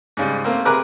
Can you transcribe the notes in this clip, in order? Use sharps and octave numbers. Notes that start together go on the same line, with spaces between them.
G#2 C#3 G3
A3 A#3 C4
C3 G#4 A#4 B4 D6 F#6